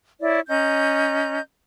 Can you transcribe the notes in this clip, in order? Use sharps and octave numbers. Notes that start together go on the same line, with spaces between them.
E4 C#5 D5
C#4 D#5 A#5 G6